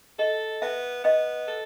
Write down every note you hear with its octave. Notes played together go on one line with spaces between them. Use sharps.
A4 D#5
B3 E5
B3 D#5
A4